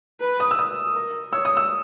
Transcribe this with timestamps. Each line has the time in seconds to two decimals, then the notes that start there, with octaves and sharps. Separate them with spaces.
0.21 B4
0.40 D#6
0.51 E6
0.59 D#6
0.95 A#4
1.32 C#5 E6
1.45 D#6
1.57 E6